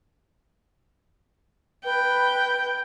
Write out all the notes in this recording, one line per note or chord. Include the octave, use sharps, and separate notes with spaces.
B4 G5